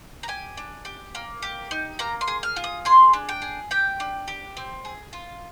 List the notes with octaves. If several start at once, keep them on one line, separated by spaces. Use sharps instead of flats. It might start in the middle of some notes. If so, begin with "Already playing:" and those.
A#5
G4 G#5
D4
G4
A#3
G4
D#4
A#3 A#5
C6
G#4
F6
F4
D#6
G#4 C6
D4
G5
G#4
G4 G5
D4
G4
C4
G#4
F4